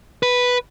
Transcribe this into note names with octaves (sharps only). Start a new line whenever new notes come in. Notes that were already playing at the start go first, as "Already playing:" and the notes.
B4